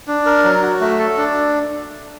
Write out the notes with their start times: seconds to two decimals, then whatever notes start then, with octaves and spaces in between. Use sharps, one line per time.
0.08 D4
0.26 A#4
0.44 F#3
0.62 F#4
0.81 A3
0.99 A4
1.17 D4